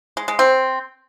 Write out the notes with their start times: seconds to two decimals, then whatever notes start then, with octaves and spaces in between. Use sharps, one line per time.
0.17 G#3
0.28 G#3
0.39 C4